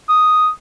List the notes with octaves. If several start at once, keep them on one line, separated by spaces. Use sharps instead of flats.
D#6